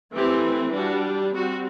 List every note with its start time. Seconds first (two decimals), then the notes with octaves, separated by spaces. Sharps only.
0.15 E3 A3 C4 G4
0.75 G3 D4 F#4
1.35 G3 C4 F#4